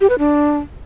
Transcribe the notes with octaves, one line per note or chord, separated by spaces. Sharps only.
G4
B4
D4